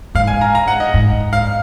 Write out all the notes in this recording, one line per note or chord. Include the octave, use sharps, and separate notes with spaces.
G#2 F5
G#5
A#5
A#5
F#5
D#5
G#2
F5